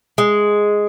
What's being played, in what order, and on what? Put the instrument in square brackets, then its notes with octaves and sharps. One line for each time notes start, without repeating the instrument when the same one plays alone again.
[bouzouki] G#3